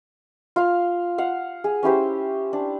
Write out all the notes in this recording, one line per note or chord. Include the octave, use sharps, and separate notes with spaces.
F4 F5
F5 F#5
G#4
C#4 E4 G4 C5
D4